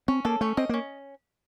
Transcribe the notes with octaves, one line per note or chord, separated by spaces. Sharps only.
C4 C#4
A#3 A4
A3 C#4
C4 D#5
A#3
C#4